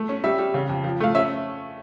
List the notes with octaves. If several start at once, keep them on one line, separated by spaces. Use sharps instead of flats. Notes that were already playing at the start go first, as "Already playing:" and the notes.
Already playing: A3
C#4
G3 E5
G3
C#3
F2
F3
A3 F5
C#4 E5